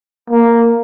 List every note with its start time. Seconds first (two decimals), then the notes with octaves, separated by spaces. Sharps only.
0.30 A#3